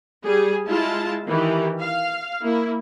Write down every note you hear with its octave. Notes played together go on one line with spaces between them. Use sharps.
G3 G#4
G#3 E4 F4 A5
D#3 E3 G4
F5
A#3 E4